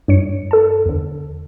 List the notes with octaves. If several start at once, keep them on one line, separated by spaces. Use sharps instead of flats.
G2 C#5 C#7
A4 A5
E2 D3